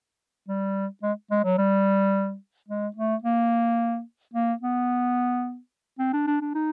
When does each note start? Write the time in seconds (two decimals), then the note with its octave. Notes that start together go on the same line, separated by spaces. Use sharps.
0.48 G3
1.03 G#3
1.31 G#3
1.45 F#3
1.58 G3
2.69 G#3
2.96 A3
3.24 A#3
4.34 A#3
4.61 B3
5.99 C4
6.13 D4
6.27 D4
6.41 D4
6.55 D#4